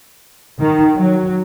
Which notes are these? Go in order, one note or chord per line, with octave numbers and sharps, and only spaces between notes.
D#3
F#3